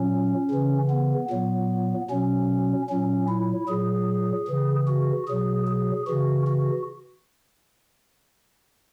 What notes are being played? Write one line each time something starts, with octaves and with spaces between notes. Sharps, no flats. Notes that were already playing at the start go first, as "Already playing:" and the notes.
Already playing: A#2 F#3 C#4
C#3 E3
B3
A#2 F#3 B3
B2 F#3 C#4
A#2 F#3 C#4
E4
A#2 F#3 G#4
C#3 E3
F#4
B2 F#3 G#4
G#4
C#3 E3 F#4
F#4